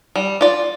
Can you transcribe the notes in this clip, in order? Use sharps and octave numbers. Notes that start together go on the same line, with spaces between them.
G3
F4 D5